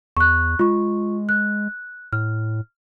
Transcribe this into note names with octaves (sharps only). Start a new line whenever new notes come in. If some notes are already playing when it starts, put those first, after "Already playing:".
E2 C#6 F#6
G#3 F4 C#6
F#6
A2 F6